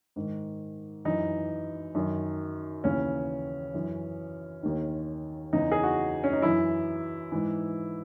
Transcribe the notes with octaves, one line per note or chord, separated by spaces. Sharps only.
G#2 D#3
F#2 E3 D#4
F#2 D#3
D#2 C#3 E3 C#4
F#2 E3
D#2 D#3
E2 C#3 E3 D#4
G#4
F#4
C#4
D#4
F#2 E3 E4
G#2 E3